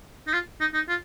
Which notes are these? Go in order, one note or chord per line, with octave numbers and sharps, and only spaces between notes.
D#4
F4
D#4
D#4
F4